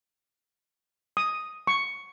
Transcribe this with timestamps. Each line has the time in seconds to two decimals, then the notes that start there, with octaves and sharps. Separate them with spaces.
1.17 D#6
1.67 C#6